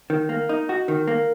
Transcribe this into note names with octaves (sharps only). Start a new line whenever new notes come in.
D#3
A#3
D#4
F#4
D#3
A#3